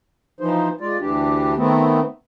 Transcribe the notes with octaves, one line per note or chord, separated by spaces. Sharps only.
E3 F3 D#4 C5
G#3 F4 D5
D2 E3 D4 G4
D#3 A3 B3 C4